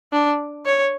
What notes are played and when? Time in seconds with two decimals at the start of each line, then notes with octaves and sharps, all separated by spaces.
0.12 D4
0.66 C#5